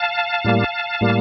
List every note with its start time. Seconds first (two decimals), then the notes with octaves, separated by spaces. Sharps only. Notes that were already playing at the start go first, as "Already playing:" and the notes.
Already playing: F5 A5
0.45 A2 G3 A#3
1.01 A2 G3 A#3